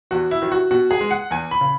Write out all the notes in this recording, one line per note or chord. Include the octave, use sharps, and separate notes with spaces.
E2 F#4
E4
D#3 F#3
F#4
B2 F#4
G#4
G#3
F#5
E2 G#5
B5
C#3